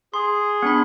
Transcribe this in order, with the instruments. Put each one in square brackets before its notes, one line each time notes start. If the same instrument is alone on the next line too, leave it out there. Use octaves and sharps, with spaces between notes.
[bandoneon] G#4 [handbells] C6
[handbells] B3 D4 B5